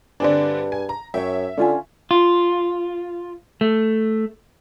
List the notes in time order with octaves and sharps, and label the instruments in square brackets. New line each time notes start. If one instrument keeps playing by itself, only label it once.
[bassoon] G2 [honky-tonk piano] D3 C4 D4 [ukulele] G#4 A4 D5
[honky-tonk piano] G#5
A#5
[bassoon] F#2 [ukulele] C#5 G5 [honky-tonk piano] E5
[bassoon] D3 [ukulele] C#4 F4 G#5
[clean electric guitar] F4
A3